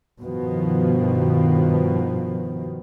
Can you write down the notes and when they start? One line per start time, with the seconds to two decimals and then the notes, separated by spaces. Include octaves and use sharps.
0.20 G2 B2 D#3 F3